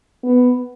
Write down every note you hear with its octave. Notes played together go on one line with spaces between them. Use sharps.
B3